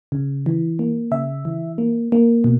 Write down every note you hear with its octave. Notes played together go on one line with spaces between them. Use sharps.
C#3
E3
A#3
C#3 E5
E3
A#3
A#3
B2